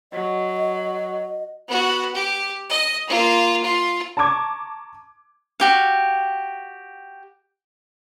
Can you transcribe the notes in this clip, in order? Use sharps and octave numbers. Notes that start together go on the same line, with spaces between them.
F#3 D#5
B3 F#4
G4
D#5
A#3 F4
F4
A5 A#5 C#6 D6 G#6
F#4 G4 F5